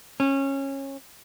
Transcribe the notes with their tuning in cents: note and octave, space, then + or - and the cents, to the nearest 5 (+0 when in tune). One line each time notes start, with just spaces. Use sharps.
C#4 -20